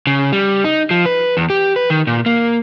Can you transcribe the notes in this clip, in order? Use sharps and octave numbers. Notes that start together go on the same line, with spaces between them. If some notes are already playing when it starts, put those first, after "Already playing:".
C#3
G3
D#4
F3
B4
E2
G4
B4
D#3
A#2
A#3